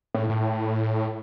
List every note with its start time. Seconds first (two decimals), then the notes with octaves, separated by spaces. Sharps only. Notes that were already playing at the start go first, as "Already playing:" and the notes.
0.14 A2
0.29 A2